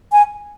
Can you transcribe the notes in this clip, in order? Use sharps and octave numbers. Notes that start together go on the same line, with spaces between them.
G#5